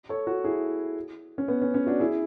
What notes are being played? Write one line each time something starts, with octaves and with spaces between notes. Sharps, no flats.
A4 C#5
F#4 A4
E4 G#4
C#4
B3
C#4
C#4
D4 F#4
E4 G#4